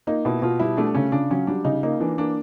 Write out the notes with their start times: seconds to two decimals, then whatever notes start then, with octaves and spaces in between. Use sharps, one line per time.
0.07 A#3 D#4
0.25 B2 E4
0.42 B2 F4
0.60 G3 E4
0.77 A3 D4
0.95 C#3 C#4
1.12 C#3 D4
1.31 F#3 C#4
1.47 G3 D4
1.65 C#3 D#4
1.83 A#3 D#4
2.00 E3 D4
2.18 A#3 D4